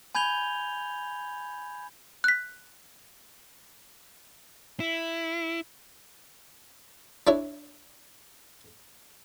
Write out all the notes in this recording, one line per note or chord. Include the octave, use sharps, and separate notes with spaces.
G#5 B5 G6 G#6 F7 G7
F#6 B6
E4
D4 E4 C#5